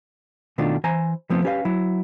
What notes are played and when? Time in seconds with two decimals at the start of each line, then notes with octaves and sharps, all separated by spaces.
0.58 B2 D#3 A3 D4 F4
0.84 E3 C5 G#5 A#5
1.30 F3 A3 B3 C4
1.44 C#4 G4 B4 D5 F5
1.65 F#3 E4